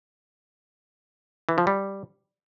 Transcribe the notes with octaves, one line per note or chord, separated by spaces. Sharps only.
E3
F3
G3